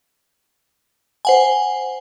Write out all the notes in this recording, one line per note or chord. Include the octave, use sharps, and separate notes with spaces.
C5 F#5 G#5